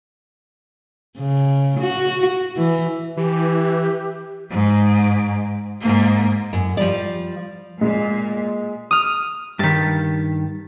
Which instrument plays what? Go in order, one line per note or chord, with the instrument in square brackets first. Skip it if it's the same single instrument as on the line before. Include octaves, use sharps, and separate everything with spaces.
[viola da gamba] C#3
F#4
E3
[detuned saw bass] E3 [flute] G4
[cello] G#2
G#2 A#3
[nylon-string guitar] F#2
F3 G3 D5
[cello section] A#2 [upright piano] G#3
[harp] D#6 F6
[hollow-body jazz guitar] G2 D#3 [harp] A6 B6